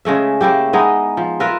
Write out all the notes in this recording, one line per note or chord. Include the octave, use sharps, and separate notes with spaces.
C#3 G#3 A3 E5
A3 A#3 E4 G4
G#3 B3 D#4 E4
F3
F4 A#4 B4 E5